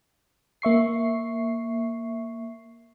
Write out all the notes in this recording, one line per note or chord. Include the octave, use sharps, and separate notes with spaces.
A#3 E5 C#6 C7